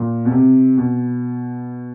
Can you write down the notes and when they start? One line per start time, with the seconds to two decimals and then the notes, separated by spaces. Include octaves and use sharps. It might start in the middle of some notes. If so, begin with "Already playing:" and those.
Already playing: A#2
0.25 B2
0.31 C3
0.78 B2